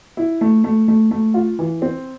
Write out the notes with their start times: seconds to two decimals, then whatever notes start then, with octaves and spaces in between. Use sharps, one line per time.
0.17 E4
0.41 A3
0.64 A3
0.88 A3
1.11 A3
1.34 F4
1.59 E3
1.82 C4